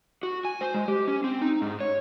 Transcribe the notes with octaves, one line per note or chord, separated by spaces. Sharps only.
F#4
G#5
C5
G#3
G4
C#4
C4
D#4
G#2
C#5